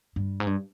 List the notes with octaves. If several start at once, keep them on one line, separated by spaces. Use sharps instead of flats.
G2
G#2
G2